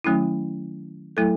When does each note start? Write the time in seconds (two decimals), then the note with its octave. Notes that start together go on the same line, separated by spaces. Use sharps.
0.04 D#3 F#3 A3 C#4 E4
1.17 F#3 A3 E4 A4